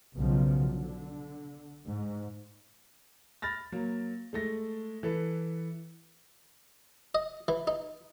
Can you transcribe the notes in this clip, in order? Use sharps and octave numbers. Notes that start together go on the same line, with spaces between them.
B1 C#3 F3
D3
G#2
B5 F6 A6 A#6
F#3 A#3
G#3 A3 A#6
E3 A4 B4
D#5
E3
D#4